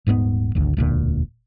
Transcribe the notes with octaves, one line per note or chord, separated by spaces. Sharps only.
D#1 G#2 G3 B3
G#1 D2
E1 D2 A#2